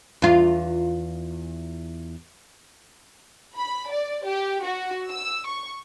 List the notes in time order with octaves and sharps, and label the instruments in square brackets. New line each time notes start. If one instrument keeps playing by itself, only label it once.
[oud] E2 F4
[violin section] B5
D5
G4
F#4
E6
C#6